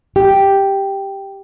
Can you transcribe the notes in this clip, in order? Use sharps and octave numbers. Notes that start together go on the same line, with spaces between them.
G4